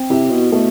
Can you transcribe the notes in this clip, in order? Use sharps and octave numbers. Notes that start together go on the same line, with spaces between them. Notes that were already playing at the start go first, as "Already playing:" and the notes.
Already playing: C4
C3 E4
B2
B2 A3